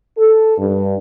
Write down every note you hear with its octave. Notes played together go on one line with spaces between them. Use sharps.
A4
G2